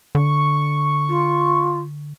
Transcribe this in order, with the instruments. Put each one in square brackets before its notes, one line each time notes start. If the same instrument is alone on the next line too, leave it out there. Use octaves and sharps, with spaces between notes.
[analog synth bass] D3 [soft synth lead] C#6
[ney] F4